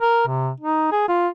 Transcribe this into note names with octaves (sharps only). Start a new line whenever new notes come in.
A#4
C3
D#4
G#4
F4